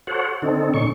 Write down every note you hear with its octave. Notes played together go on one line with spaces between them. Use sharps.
F#4 A4 C5 C#5 F#5
D3 C4 D#4 A4
A#2 D3 C#4 D#4 C#6